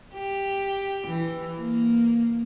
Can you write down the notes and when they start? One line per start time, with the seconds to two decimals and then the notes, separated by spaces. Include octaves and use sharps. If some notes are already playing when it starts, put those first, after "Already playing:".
0.14 G4
1.07 E3
1.58 A#3